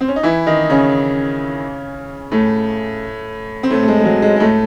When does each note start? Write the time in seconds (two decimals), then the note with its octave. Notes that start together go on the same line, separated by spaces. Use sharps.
0.01 C4
0.08 C#4
0.16 D#4
0.23 E3 E4
0.46 D#3 D#4
0.70 C#3 C#4
2.32 A2 A3
3.63 C4
3.70 A2 A3
3.83 A3
3.88 G#3
4.00 G#3
4.05 F#3
4.22 G#3
4.36 G#3
4.40 A2 A3